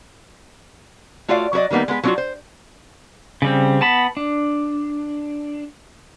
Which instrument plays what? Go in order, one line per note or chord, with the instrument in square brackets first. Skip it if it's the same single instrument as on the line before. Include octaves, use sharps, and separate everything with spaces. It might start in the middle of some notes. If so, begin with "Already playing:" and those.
[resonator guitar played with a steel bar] A3 F4 F#4 C#5 D5 F5
F#3 F#4 A#4 D5 D#5
D#3 G3 A#3 B3 D#4
G#3 B3 A#4 B4
F#3 A3 C4 D4 F4 F#4
C5
[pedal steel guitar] C#3 G3 C4
B3 A5 B5
D4